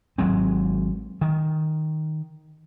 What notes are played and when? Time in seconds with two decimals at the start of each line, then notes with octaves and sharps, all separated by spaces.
0.18 G#1 F#3 G#3 C4
1.21 D#3